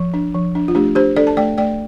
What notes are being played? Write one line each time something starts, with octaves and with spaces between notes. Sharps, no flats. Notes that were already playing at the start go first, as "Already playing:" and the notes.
Already playing: F3
D4
F3
D4
F4
A3 D4 G4
D4 G4 C5
D4 A4 D5
A5
A3 D5 G5
A3 D5 G5